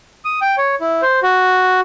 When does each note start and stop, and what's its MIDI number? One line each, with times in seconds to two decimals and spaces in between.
0.25 0.40 87
0.41 0.56 79
0.58 0.75 73
0.80 1.01 64
1.02 1.20 72
1.23 1.80 66